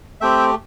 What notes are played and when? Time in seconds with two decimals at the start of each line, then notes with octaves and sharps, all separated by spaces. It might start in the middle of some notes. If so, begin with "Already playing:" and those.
0.21 A3 C4 G4 E5 G5